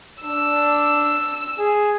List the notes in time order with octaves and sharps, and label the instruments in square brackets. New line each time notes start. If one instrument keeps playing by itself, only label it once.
[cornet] D4 [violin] E6
[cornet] G#4